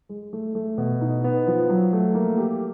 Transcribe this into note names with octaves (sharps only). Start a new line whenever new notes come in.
G#3
A3
A3
B2
D#4
B3
F3
F#3
A3
A#3
G4